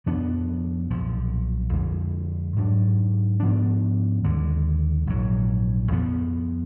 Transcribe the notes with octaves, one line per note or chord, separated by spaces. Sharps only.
F2 F3 B3 D4
B1 A#2 F3
F2 D3 G#3
G#2 F#3 D4
G#2 F3 B3 D4
D#2 D3 G#3
A#1 G#2 F#3
F2 F3 B3